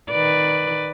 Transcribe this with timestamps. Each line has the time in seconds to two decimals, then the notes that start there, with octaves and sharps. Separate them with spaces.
0.10 D#3 B4 D5